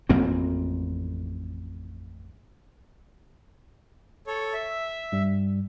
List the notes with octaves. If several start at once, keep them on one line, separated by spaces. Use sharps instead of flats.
A1 F2 A#3 C4
A4 C#5
E5
G2 G3